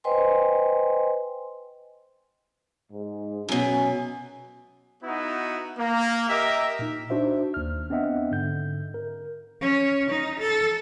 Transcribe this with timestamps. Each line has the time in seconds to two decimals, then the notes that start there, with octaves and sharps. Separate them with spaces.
0.04 B4 C5 D#5 G5 G#5 C6
2.92 G#2
3.49 F#2 B2 C#4 G#5
5.03 B3 D#4 E4 F#4
5.78 A#3
6.29 G4 A#4 D#5 E5
6.79 A#2 D#4
7.10 D4 D#4 F#4 C5 E5
7.54 D#2 F6
7.90 B3 C4 D4 D#5 E5 F#5
8.31 G#2 D3 G6
8.94 A#4
9.61 C#4
10.10 D#4
10.39 A4